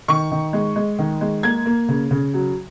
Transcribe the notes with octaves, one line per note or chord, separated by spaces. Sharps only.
D#3 C#6
D#3
G#3
G#3
D#3
G#3
A#3 G#6
A#3
C#3
C#3
F#3